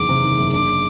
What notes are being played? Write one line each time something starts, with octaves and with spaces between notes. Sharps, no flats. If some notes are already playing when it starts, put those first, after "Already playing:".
Already playing: F#1 E2 D#3 D6
C3
D#3
F#1
D4 D6